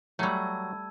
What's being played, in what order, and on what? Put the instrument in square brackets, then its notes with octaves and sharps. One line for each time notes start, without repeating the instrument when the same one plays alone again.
[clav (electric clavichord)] F#3 [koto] G3 A3 [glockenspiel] A5 E6 G#6